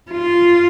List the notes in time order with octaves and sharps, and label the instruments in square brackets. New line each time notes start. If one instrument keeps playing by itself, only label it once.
[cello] F4